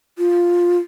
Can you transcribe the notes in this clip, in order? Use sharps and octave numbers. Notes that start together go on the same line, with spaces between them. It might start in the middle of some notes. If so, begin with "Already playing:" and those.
F4